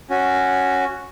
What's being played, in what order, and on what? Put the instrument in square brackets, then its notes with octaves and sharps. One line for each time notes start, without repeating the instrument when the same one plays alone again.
[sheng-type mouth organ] C#4 F#4